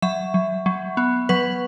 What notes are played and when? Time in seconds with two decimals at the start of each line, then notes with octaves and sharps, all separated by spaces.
0.02 F#3 E5
0.34 F#3
0.66 F#3
0.97 B3
1.29 F#3 B4